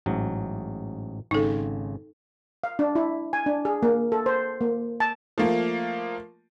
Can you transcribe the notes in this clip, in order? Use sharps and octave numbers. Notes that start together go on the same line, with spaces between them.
A1 G#2 F#3
G#1 C#3 D#4 A4
F5
D4
E4
G#5
D4
G#4
A#3
A4
C5
A#3
A5
F3 A3 A#3 F4